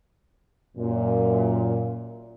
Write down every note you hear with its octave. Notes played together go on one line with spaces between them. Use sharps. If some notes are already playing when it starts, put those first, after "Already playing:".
F#2 A#2